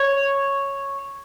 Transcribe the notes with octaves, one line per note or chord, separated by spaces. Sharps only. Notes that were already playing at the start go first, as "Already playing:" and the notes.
Already playing: C#5